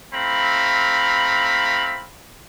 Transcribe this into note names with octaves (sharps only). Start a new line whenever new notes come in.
A3 C4 E4 F5 A#5 B5